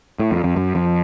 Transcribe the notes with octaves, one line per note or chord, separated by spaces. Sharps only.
A2
F2
F2
F#2
F2